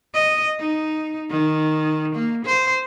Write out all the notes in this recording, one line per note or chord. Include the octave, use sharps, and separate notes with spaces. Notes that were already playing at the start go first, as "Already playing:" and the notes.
D#5
D#4
D#3
A#3
C5